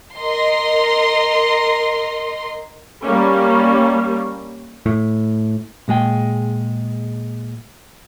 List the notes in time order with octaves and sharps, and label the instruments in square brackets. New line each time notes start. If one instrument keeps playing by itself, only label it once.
[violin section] A#4 D#5 C6
[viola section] G3 A#3 C#4
[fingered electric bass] A2
[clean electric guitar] A#2 G#3 G#4 G5